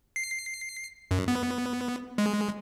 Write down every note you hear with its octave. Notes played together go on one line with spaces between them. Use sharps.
C7
F#2
B3
G#3